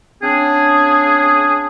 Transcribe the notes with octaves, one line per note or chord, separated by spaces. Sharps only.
C#3 C4 D4 G#4